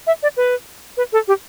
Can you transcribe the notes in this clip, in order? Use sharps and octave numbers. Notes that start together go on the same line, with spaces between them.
E5
D5
B4
B4
A4
G4